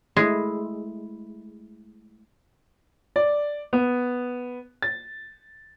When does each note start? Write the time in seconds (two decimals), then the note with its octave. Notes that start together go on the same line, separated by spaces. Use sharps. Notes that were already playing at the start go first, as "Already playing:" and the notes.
0.17 G#3 A3 E4
3.16 D5
3.73 B3
4.82 A6